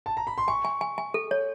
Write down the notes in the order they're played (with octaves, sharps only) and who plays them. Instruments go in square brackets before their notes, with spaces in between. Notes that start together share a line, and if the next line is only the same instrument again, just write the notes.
[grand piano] A5
A#5
B5
C6
[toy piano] G#5 [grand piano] C#6
[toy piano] G#5
G#5
G#5
A4
C#5